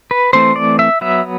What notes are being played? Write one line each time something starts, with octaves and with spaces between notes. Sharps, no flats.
B4
E3 A3 C4 C5
D5
E5
F#3 B3 E5